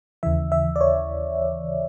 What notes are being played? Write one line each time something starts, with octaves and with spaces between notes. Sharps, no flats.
D#2 C#3 E3 E5
E5
D5
C#5